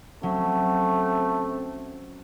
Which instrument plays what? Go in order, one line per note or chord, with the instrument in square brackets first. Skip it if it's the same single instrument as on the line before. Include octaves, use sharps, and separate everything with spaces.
[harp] F#3 C#4 [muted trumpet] A3 [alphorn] C4